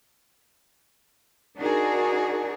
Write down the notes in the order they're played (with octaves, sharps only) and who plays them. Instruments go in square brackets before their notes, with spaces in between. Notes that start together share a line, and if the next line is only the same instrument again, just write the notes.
[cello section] D4 D#4 F#4 G#4 A#4